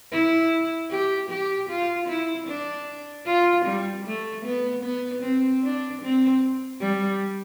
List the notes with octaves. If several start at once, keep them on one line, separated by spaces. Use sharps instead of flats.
E4
G4
G4
F4
E4
D4
F4
G3
A3
B3
B3
C4
D4
C4
G3